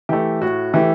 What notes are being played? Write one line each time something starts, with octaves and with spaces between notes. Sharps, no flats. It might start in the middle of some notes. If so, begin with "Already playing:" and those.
E3 A3 G4
A2 F#4
E3 A3 G4